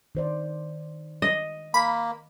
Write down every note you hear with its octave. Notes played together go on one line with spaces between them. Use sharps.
D#3 C5 D5
D#5
A#3 B5